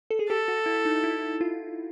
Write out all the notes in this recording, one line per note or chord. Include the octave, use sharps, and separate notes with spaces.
A4
G#4
G4 A4
F#4
E4
D#4
E4
F4